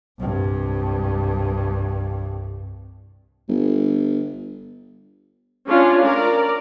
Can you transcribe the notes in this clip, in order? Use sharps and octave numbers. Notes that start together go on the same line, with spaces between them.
C2 G2
G1
C#4 D4 F4
A#4 D5